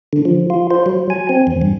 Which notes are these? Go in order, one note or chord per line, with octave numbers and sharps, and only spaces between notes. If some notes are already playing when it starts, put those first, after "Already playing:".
D3
F3
F4
C5
F#3
G#5
C4
E2
G2